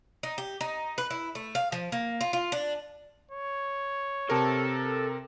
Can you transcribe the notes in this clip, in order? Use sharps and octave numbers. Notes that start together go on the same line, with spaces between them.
D#4
G4
D#4
B4
E4
A3
F5
F3
A#3
F4
F4
D4
C#5
C3 A4 A#4 A5